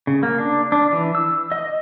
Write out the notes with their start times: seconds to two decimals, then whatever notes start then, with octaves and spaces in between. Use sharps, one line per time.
0.07 C#3
0.23 A#3
0.38 D4
0.72 D4
0.92 E3
1.15 E6
1.52 D#5